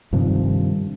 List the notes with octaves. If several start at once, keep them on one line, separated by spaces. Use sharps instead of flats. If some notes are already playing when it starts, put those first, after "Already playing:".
G2 C3 D#3 F3